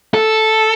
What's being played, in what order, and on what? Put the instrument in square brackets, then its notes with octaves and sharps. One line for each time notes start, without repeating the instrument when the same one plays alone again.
[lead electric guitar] A4